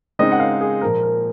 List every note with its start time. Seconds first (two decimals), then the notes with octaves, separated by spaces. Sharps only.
0.19 C#3 G#3 C4 D#4 D#5
0.32 F#5
0.40 F5
0.61 G#4
0.81 A#2 F3 A#3 A#4
1.03 A#4